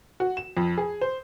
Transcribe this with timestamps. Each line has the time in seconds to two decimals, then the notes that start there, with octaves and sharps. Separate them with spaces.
0.20 F#4
0.37 E7
0.57 F2
0.78 G#4
1.01 C5